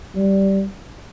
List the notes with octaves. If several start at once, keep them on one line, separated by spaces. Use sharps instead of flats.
G3